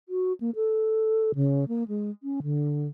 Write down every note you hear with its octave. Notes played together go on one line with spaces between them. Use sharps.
F#4
A#3
A4
C#3
A#3
G#3
C#4
D3